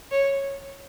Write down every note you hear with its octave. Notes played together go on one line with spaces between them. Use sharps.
C#5